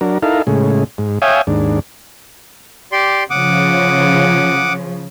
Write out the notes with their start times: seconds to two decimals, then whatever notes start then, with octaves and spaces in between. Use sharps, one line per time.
0.01 F#3 D4 A#4
0.23 D#4 E4 A4 A#4 F5
0.47 A2 C#3 G#3
0.98 G#2
1.22 C#5 E5 F5 G5 G#5 D#6
1.47 D#2 G#2 D4
2.92 G4 D5 C6
3.30 C#3 F3 F#5 D6 D#6